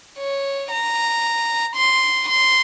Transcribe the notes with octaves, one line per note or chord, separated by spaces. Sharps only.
C#5
A#5
C6
C6